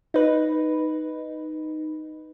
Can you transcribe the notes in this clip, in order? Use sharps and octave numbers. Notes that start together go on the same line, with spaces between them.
D#4 B4